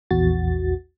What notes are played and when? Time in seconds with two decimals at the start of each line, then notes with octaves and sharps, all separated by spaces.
0.11 A#1 E2 F#4 A6